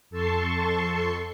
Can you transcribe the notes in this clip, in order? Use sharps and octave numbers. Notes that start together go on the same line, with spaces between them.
F2 A4 A5 C6 C#6 C7